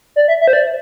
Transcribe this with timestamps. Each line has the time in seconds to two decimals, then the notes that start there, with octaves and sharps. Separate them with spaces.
0.16 D5
0.28 E5
0.41 E5
0.48 C5
0.53 D5